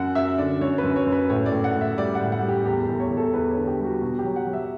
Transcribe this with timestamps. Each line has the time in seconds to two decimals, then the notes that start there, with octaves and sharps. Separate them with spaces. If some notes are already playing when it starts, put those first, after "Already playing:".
Already playing: F#2 F#5
0.15 F#2 E5
0.38 D3 D5
0.61 F#2 C#5
0.78 B4
0.84 F#2
0.96 C#5
1.06 F#2
1.12 B4
1.29 A2 C#5
1.46 D5
1.52 A2
1.64 F#5
1.75 A2
1.81 E5
1.97 G3 D5
2.15 F#5
2.21 A2
2.32 F#5
2.42 G3
2.48 G4
2.65 E2 G4
2.83 A4
2.89 E2
3.00 C#5
3.10 E2
3.17 A4
3.33 E2 B4
3.51 C#5
3.56 D3
3.67 G4
3.79 G3
3.84 F#4
4.01 B2 F#4
4.19 G4
4.24 F#3
4.36 F#5
4.47 F#3
4.53 E5